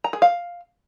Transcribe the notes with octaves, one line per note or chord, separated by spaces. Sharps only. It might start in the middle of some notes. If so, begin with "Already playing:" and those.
A#5
G#4
F5